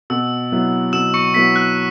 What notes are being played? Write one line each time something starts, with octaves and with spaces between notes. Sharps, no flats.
B2 E6
F#3 B3 E4
B2 E6 E7
C#6 C#7
F#3 B3 E4 B6
F#6